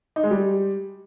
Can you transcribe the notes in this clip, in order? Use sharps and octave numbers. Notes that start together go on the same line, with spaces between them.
D#4
G#3
G3